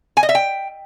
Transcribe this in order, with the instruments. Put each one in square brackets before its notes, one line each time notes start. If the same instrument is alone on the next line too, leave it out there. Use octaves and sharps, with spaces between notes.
[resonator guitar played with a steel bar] G#5
D#5
E5
G5